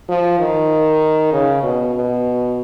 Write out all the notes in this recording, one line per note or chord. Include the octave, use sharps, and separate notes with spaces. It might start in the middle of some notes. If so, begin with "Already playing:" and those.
F3
D#3
C#3
B2
B2